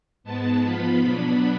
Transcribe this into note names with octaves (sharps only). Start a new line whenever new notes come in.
G#2 G#3 B3 A5
G#2 F3 B3 F4 B5
B2 F#3 B3 D4